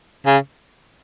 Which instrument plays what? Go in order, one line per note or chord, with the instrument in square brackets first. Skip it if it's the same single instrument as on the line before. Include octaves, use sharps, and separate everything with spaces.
[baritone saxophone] C#3